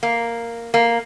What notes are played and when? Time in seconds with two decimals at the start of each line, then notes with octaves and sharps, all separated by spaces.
0.03 A#3
0.74 A#3